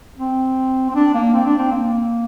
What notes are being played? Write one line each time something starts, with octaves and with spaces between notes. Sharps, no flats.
C4
C4
D4
A#3
C4
D4
C4
A#3